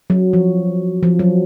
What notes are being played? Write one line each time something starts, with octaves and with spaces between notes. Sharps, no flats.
F#3
F3
F3
F#3